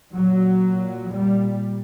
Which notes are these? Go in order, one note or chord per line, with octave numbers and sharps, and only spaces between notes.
A#2 F#3
G3